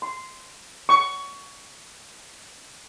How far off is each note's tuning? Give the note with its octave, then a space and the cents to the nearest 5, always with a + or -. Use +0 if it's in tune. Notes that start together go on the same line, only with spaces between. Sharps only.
C6 -10
C#6 +20